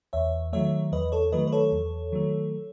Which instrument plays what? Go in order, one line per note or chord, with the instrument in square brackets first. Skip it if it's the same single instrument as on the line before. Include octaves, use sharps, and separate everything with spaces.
[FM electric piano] E2 C#5 E5
D#3 F#3 A3 C#5 E5
E2 B4 D#5
A4 C#5
D#3 F#3 A3 B4 D#5
B4
A4 C#5
E2
D#3 F#3 A3